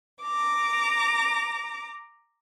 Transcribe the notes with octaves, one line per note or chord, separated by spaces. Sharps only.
A#5 D6